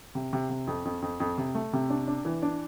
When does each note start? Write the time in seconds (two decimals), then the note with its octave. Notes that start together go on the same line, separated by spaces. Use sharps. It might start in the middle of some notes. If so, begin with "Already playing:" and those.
0.15 C3
0.33 C3
0.50 C3
0.67 F2
0.85 F2
1.02 F2
1.20 F2
1.38 C3
1.55 A3
1.73 C3
1.90 D4
2.07 D4
2.25 E3
2.42 D4